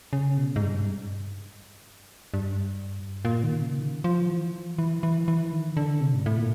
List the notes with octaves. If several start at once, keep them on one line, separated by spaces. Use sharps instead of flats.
C#3
B2
G#2
G2
G2
A#2
D#3
C#3
D#3
F3
E3
E3
E3
E3
D#3
D3
C3
G#2
A2
A#2